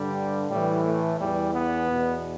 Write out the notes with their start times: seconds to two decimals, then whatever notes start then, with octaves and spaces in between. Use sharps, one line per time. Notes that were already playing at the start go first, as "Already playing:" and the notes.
Already playing: G2 D3 G3
0.49 A2 E3 G3
0.83 A3
1.18 E2 E3 G3
1.52 B3
1.87 E2 B2